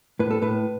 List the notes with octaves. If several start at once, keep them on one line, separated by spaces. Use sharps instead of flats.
A2 B4
A4
A2 B4